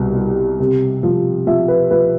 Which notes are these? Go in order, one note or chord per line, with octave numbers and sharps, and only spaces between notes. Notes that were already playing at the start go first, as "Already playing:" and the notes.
Already playing: C2 B2
G3
C3
F3
F3 E5
B4
F3 B4